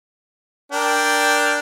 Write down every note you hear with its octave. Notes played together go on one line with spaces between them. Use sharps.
D4 A#4 G5